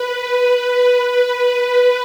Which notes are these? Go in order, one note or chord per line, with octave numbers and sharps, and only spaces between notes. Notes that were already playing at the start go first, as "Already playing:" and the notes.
Already playing: B4
B4